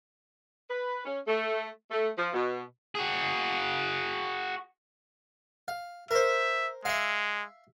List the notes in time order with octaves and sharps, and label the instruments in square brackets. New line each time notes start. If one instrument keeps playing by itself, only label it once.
[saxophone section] B4
C#4
A3
A3
F3
B2
[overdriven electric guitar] F#4 G#4
[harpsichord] F5
[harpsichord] A#4 C5 [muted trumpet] E5
[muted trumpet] G#3 [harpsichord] E5 F5